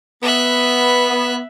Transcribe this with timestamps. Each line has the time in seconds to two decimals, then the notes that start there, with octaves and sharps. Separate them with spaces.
0.23 B3 E5 F#6